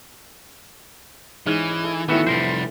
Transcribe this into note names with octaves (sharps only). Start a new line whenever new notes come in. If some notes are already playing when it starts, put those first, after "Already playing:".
G#2 E3 C#4
D#5
A4
A2 D#3 E3 B3 F#4 A4 B4
C3 F3 G3 A#4 C5